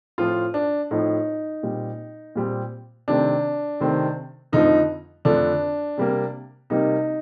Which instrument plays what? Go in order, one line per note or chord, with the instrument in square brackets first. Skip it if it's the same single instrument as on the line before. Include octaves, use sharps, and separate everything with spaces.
[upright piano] A2 F3 C4 F4
D4
A2 F3 C4 D#4
A#2 G3 C4
A#2 G3 C4
C3 D#3 A3 C4 D4
C3 D#3 A3 C4
F2 D3 F3 A3 D#4
F2 D3 F3 A3 D4
C3 G3 A#3
C3 G3 A#3 D#4